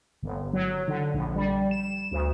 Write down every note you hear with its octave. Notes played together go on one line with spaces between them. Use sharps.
G1
F#3
D3
A#1
G3
E7
D2